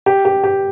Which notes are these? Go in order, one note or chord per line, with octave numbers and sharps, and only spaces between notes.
G4
G4
G4